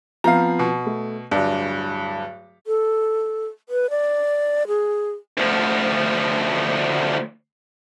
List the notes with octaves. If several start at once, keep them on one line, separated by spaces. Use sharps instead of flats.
F3 B3 C4 F5 A#5
B2
A3
D1 G2 D5
A4
B4
D5
G#4
D2 F3